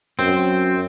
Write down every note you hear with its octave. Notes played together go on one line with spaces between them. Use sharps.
F#2 C4